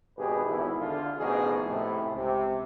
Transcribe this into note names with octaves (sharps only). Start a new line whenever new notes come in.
G#1 B2 G4 G#4 B4
G#1 E2 E4
D3 F4
A1 D#2 B2 F3 D#4 G#4
A2 C3 E4
C#2 C3